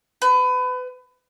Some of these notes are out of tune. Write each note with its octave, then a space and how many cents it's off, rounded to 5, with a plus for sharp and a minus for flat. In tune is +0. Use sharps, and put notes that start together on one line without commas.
B4 +30